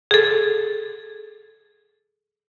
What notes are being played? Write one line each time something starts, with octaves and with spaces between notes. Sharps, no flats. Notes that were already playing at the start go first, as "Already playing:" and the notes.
G#4 A4